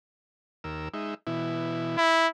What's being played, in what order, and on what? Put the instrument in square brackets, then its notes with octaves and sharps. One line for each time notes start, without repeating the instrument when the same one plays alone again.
[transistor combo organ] D#2 A#4 E6
G#3 D#4 E5
B2 E3 E4
[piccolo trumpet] E4